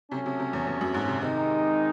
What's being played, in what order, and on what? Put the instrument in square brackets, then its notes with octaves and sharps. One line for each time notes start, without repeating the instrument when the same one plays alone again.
[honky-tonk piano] C3 [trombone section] C#4
[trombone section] F#3 A3
[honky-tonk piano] C3
C3
E2
E2
F#2
G#2
C3
[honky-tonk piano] C3 [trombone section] D#3 G#3 D#4